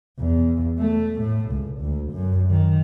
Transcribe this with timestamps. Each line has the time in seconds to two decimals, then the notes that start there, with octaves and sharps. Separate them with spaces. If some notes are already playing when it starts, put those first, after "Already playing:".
0.19 E2
0.79 A3
1.21 A2
1.51 C#2
1.80 D2
2.12 F#2
2.51 D#3